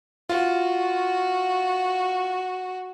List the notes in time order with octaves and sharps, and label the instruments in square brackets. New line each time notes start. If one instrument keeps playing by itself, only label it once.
[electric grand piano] F4 [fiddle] F#4